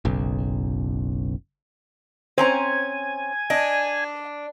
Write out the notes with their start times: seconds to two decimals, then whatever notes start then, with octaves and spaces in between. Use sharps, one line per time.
0.05 F#1 B1
2.38 C4 C#4 C5 G#5 A#5
3.50 D4 D#5